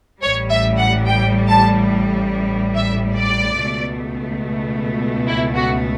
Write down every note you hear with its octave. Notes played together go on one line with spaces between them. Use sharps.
A1 A2 G3 C#5
E5
F#5
G5
A5
E5
D5
C#2 B2 A3
E4
F#4